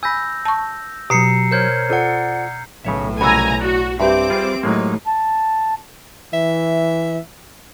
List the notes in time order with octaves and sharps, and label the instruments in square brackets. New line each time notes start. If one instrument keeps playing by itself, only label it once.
[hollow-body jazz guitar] G#5 B5 [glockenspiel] E6 G6 A#6
[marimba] A5 C#6
[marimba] B2 [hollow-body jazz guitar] F#3 G4 [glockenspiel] A#5 C7 C#7
[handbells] A#4 C5 C#5 [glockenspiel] F6 G6 G#6
[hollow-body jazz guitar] F4 A4 C5 [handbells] D5 F#5
[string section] B1 A2 [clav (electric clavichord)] C#3 C#5 E5
[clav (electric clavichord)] C2 C#3 F#4 [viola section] G#5 A#5 [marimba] B5 E6
[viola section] F#4 [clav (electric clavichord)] D5
[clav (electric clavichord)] G2 [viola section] C4 [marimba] G4 B4 E5 [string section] D6
[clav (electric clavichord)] G3 F4 G#4
[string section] A2 D#4 [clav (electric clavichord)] F#3 G#3 A#3
[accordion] A5
[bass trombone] E3 [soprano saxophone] E5